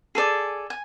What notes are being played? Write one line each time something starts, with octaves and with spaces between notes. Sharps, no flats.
G#4 A4 D5 G#5
G#5